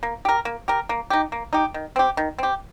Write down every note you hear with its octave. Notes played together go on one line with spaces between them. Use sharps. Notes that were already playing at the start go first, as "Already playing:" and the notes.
A#3
G4 A#4
A#3
G4 A#4
A#3
D#4 G4
A#3
D#4 G4
D#3
C4 G4
D#3
C4 G4